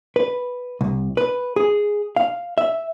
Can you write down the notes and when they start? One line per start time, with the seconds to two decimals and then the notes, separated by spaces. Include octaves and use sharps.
0.16 B4
0.81 C2
1.17 B4
1.56 G#4
2.16 F5
2.58 E5